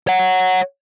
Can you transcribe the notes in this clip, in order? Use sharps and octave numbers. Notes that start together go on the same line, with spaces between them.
C#5 F#5